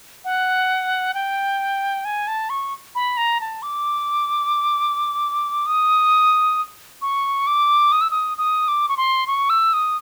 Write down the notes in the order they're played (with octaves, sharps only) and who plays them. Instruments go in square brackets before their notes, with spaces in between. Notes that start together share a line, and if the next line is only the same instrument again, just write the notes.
[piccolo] F#5
G5
G#5
A5
C#6
B5
A#5
A5
D6
D#6
C#6
D6
D#6
E6
D#6
D#6
D6
C#6
C6
C#6
E6
D#6